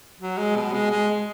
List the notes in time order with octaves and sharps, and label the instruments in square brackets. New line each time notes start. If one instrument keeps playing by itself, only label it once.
[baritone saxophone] F#3
G#3
B2
G#3
G#3